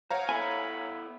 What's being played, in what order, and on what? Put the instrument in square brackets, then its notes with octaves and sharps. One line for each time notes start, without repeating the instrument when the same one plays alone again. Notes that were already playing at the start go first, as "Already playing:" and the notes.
[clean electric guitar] C5 F#5 [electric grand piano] C#5 F5 A#5
[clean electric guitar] B3 E4 A4 [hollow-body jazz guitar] G#5 [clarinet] B5